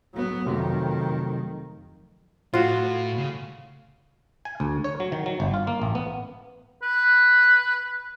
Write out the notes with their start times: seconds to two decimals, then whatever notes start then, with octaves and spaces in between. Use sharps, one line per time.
0.15 F#3 B3
0.47 F2 C3 D#3 F#3 A3
2.54 A2 F4 F#4
3.18 C#3
4.45 G#5
4.60 D2
4.84 C#5
5.00 F#3
5.12 D#3
5.26 F#3
5.40 G1
5.54 F4
5.67 A#3
5.82 A1
5.95 B3
6.82 B4